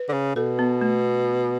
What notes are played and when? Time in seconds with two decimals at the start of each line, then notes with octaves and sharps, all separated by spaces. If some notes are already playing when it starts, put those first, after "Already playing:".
Already playing: B4
0.09 D3
0.13 C#3
0.36 B2 A4
0.59 B3
0.81 A3